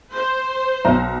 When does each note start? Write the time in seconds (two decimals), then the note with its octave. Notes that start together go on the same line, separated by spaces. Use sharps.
0.12 C5
0.85 B1 A#5